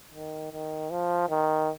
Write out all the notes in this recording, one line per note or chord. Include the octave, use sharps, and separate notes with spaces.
D#3
D#3
F3
D#3